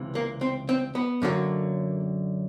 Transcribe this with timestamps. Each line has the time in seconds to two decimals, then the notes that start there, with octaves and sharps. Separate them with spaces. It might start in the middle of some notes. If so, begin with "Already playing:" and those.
Already playing: C#2 C3 E3
0.15 A#3
0.41 C4
0.69 C4
0.95 B3
1.22 F#2 D3 F#3 A#3